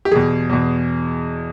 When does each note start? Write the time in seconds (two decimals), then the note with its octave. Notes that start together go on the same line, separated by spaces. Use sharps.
0.05 G4
0.11 E2 B2 G#4
0.49 E2 B2